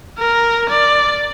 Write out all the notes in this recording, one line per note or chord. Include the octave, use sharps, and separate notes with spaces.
A#4
D5